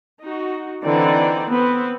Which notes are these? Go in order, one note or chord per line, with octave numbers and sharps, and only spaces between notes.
D#4 F#4
D3 E3 C4 D#4 D5
B3 C4 B4